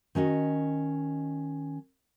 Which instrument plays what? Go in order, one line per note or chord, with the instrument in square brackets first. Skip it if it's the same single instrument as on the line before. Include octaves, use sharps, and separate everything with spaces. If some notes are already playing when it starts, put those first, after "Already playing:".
[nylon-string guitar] D#3 C#4 F#4 D#5